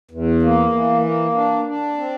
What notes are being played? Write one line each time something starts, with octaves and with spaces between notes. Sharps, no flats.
E2
A#3
E3
A#3
D4
D4
C4